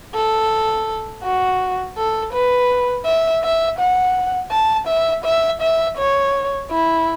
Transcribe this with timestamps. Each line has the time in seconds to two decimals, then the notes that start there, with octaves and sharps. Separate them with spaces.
0.15 A4
1.24 F#4
1.98 A4
2.33 B4
3.06 E5
3.43 E5
3.79 F#5
4.51 A5
4.88 E5
5.25 E5
5.62 E5
5.98 C#5
6.71 E4